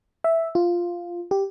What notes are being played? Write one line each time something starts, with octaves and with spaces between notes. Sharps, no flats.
E5
F4
G4